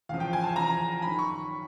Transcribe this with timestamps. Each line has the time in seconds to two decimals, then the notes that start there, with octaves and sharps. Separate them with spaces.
0.09 E2 C#3 F3 F5
0.20 G5
0.33 G#5
0.44 A5
0.56 E2 C#3 F3 A#5
1.02 F#2 B5
1.07 D#3
1.19 C#6